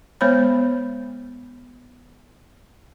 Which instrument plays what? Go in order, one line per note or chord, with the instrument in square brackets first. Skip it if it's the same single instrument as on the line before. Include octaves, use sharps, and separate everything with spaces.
[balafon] G#3 B3 C5 C#5 B5